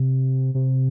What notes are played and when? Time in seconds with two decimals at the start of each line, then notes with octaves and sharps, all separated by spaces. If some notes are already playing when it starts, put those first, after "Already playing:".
Already playing: C3
0.54 C3